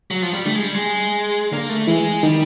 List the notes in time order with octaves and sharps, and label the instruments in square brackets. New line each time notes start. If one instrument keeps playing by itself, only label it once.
[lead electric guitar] F#3
F3
G3
[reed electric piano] D3 D4 [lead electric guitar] A3
[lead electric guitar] G#3
G3
G#3
[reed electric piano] D3 D4 [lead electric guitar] A#3
[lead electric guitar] A3
[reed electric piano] E3 E4 [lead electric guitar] G#3
[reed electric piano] D#3 D#4 [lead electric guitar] G3